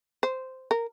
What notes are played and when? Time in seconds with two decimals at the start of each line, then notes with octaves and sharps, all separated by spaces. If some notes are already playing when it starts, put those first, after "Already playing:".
0.23 C5
0.71 A#4